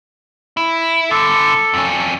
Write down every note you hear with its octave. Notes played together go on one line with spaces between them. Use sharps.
E4
G2 D3 A4
F2 C#4